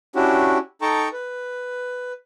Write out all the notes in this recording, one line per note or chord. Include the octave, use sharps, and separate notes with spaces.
C#4 D4 E4 F#4 G4
D#4 A4 G5 A5 A#5 C#6
B4